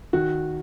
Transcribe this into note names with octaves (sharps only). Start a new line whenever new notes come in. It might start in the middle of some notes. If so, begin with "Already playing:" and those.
D#3 F#4